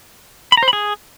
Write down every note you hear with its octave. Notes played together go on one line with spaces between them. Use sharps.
B5
A#5
C5
B5
G#4